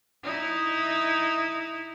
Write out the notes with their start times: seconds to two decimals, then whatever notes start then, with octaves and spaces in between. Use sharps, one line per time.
0.23 D#4 E4